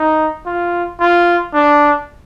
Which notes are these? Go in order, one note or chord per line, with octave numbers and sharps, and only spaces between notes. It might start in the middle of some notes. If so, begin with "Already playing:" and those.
Already playing: D#4
F4
F4
D4